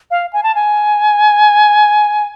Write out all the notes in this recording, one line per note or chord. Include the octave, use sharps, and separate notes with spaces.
F5
G#5
A5
G#5